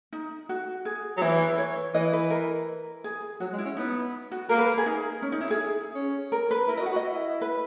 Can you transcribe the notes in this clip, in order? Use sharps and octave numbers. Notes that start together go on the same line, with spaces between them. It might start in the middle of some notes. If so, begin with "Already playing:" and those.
D#4
F#4
G#4
F#3
E3 E4
C#5
E3 D#5
B4
A#4
G#4
F#3 F#4
G#3
E4
C#4
B3 D#4
F#4
A#3 A#4
B4
A#4
G#4
D#4
C#4
D#4
E4
G#4
C#4
A#4
B4
E4 A#4
D#5
F#4
F#5
F#4
D#5
E4
B4